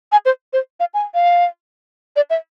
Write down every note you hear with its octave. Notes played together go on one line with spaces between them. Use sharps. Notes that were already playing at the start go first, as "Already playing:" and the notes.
G#5
C5
C5
F5
G#5
F5
D5
E5